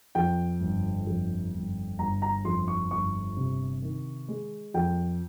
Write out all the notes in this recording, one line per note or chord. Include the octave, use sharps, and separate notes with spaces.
F2 G5
G1
F2
G1
G1 A#5
A#5
F2 C6
C#6
G1 C#6
C3
D#3
G#3
F2 G5